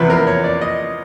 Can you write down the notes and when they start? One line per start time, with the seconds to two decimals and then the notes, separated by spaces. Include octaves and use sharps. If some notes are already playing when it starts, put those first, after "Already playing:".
Already playing: E2 C3 F3 B4
0.10 A#4
0.27 C#5
0.44 D5
0.61 D#5